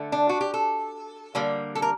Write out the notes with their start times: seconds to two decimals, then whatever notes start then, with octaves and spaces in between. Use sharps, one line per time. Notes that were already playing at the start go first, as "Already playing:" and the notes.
Already playing: D3 A3
0.12 D4
0.29 F#4
0.41 G4
0.54 A4
1.35 D3 G3 A#3
1.75 A4
1.82 A#4